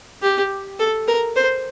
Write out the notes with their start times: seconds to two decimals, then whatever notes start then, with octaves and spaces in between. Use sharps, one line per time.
0.22 G4
0.79 A4
1.07 A#4
1.36 C5